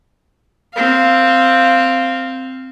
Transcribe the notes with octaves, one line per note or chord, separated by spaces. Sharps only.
C4 F5